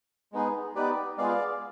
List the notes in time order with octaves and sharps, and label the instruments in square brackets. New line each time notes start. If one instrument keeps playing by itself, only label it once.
[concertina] G#3 B3 D#4 G#4
B3 D#4 G4 B4 D5
G#3 B3 F4 G#4 D5 F5